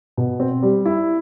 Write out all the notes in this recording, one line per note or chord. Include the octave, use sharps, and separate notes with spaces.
B2
C4
G3
E4